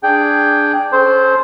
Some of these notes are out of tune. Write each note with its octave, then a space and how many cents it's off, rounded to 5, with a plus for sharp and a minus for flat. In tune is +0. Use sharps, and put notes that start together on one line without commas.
D4 +0 G#4 +0 G5 +0
C#4 +0 A4 -35 C5 +0